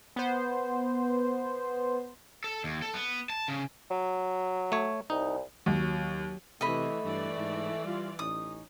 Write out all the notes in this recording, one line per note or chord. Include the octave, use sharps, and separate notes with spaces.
B3 C5
A4
D#2
A4
B3
A5
C#3
F#3
A3 C#5
C2 D#4
D#2 F#3
C3 E3 A3 D#5 B5
G2 E3 D5
G#2
G3 F4
A1 C#4 D#4 D#6